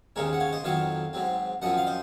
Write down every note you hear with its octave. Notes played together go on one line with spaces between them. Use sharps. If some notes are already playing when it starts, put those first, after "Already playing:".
D#2 C#3 G#3 C4 A#4 C#5
F#5
C#5 F5
C5 D#5
F2 D#3 F#3 C4 C#5 F5
G#2 F#3 C4
F#2 F3 C4 D#5 F#5
F5
C5 D#5